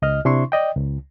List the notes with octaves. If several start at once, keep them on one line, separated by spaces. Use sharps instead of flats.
C#2 D#5 F6
C3 D4 E4 C6 C#6
D5 D#5 G5
C#2